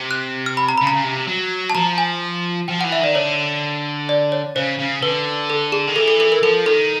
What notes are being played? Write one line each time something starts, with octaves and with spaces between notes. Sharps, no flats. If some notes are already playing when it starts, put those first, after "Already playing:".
Already playing: C3
F#6
F6
B5
A#5
C#3 B5
A#5
C#3
C3
F#3
A5
F3 A#5
G#5
F3 G5
E3 F#5
E5
D#3 D5
D3 C#5
D5
C#5
C#3 C5
C#3
D3 B4
A4
G#4
D#3
E3 A4
A4
A4
A#4
F3 A4
D#3 A4